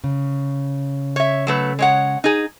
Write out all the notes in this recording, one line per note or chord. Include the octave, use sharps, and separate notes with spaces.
C#3
C#5 E5
F#3 A3 B4
G#3 C#5 F#5
D#4 G#4